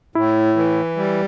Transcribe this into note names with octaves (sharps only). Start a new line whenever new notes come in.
A2 E4
E3
G3